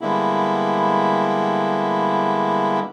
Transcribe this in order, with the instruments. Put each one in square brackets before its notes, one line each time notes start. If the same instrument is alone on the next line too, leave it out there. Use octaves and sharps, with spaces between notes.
[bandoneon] D3 G3 G#3 A#3 B3 E4